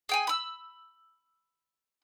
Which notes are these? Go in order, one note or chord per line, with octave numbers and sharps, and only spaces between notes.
G#4 G5 G#5
B5 E6